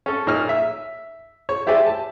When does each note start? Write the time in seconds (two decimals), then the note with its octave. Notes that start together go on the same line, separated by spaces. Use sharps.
0.06 C#4 A4
0.27 A#2 D#4 C#5 F6
0.49 E5
1.49 C#5
1.67 E4 G4 C5 D5 E5 G#5
1.86 A5